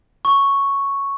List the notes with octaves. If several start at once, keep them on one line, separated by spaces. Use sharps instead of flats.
C#6